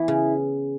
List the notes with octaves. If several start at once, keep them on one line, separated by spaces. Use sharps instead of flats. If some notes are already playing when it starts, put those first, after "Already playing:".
Already playing: E3 B3 E4
C#3